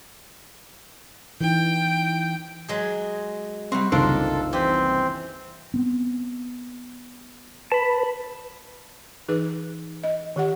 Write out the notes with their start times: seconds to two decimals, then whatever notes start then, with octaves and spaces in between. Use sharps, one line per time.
1.41 E3 D#4 G5
2.68 F#3 G#3 G#4
3.72 G3 C4 F#4
3.92 F#1 C2 D#3 D4 F4 A4 A#4 C5
4.53 E3 C4 G4
5.74 B3 C4
7.72 B4 A5 B5
9.28 E3 D#4 G#4 B4
10.04 D#5
10.36 D#3 G4 F#5